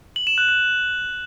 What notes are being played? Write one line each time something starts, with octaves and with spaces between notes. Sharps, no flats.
F#7
E7
F#6
F#6